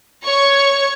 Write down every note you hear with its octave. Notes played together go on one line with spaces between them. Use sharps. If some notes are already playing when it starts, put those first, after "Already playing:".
C#5 C#6